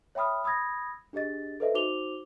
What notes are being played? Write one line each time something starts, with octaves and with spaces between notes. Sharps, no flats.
C#5 E5 G5 B5 D#6 F6
B5 D#6 E6 G#6 A#6
D4 G4 G#4 D#5 A6
A4 B4 C5 D#5 E5
D#4 F#4 C5 D6 F7 G7